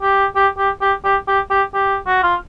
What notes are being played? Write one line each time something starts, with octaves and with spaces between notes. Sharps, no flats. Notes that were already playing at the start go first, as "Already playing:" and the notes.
G4
G4
G4
G4
G4
G4
G4
G4
F#4
F4